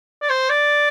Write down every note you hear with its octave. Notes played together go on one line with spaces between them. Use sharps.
D5
C5
D5